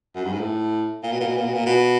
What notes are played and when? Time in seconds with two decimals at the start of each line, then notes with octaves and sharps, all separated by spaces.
0.15 F#2
0.25 G2
0.33 G#2
0.41 A2
1.03 A#2
1.12 B2
1.21 A#2
1.28 B2
1.36 A#2
1.45 B2
1.53 A#2
1.66 B2